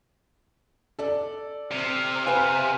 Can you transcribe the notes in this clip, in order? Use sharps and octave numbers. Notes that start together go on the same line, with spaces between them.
A4 D5
C3 F6
B4 C5 F5 G#5